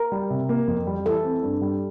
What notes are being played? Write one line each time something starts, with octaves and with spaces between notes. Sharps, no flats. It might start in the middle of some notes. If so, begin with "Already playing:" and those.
Already playing: A#4
G3
C3
A#3
F2
G3
E3 A4
C4
G2
G3